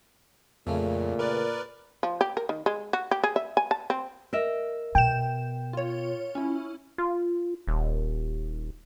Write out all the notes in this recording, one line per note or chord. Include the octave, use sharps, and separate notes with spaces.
F2 A#2 C#3 A3 A#3
A#4 B4 D5
F3
G4
A#4
D#3
G#3
F#4
G4
G#4
E5
G#5
A5
C4
A#4 D#5 E5
B2 G5 E7
F4 C#5
C#4 E4
F4
D#1